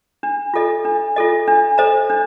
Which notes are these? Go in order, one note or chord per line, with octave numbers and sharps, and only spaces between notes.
D4
F4 A4 D#5
D4
F4 A4 D#5
D4
A4 C5 D#5 A#5
D4